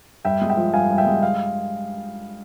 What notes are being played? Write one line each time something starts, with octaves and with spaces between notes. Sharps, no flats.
G2 E5 G5
G#3
E5 G5
F3
G2 F5 G#5
G2
E5 G5
G#3
F5